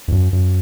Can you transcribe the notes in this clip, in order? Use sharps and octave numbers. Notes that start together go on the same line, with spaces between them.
E2
F#2
F#2